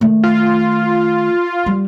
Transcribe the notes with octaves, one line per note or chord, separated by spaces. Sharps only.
D#3 A3
F4
G3